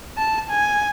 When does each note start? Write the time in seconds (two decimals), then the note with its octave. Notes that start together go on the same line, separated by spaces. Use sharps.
0.18 A5
0.50 G#5